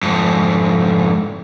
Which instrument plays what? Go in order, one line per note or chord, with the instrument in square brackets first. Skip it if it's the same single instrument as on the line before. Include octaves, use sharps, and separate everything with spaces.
[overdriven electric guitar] F2 G#2